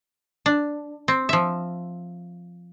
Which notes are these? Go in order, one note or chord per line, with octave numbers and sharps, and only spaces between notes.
D4
C4
F3 E5